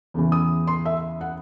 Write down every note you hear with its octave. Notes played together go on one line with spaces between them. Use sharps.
E2 C#3 E3
D#6
C6
E5
F#5